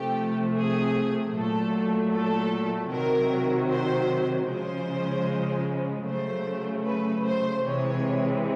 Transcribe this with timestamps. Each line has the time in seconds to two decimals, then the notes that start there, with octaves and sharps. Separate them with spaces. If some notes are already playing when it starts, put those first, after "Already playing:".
Already playing: C3 F3 A3 G4
0.55 G#4
1.34 A#2 F#3 A3 A4
2.13 A4
2.91 C3 D#3 F#3 A#4
3.70 C5
4.49 C#3 F3 G#3 C5
6.07 C#3 F#3 A3 C5
6.85 B4
7.25 C5
7.64 C3 E3 G#3 C#5